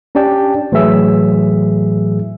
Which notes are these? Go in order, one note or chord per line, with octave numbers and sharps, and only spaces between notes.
C#4 D4 G4 D5 G5 A5
A2 E3 F#3 G#4 E5 E6